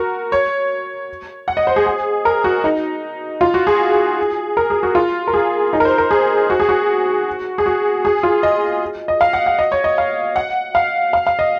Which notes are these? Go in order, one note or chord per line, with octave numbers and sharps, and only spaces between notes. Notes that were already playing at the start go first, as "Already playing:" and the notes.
Already playing: F#4 A#4
C#5
F#5
D#5
C5
G#4
G#4
A#4
F#4
D#4
F4
F#4
G#4
A#4
G#4
F#4
F4
A#4
G#4
D#4
A#4
C5
A#4
G#4
F#4
G#4
F#4
G#4
F#4
G#4
F4
D#5
D#5
F5
F#5
F#5
D#5
C#5
D#5
F5
F#5
F5
F5
F5
D#5